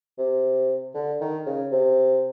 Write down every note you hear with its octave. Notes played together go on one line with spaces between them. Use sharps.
C3
D3
D#3
C#3
C3